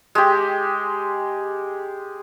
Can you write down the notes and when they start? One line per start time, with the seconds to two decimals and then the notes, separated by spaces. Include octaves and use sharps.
0.15 G#3 G4